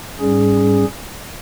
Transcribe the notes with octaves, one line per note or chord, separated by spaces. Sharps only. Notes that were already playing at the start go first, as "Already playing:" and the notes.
G#2 G3 C#4 G#4